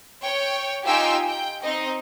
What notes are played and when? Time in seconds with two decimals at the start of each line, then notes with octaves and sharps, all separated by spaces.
0.22 C#5 G5
0.85 D#4 F4 G4 G5 G#5 E6
1.28 G5
1.63 C4 D#4 D#5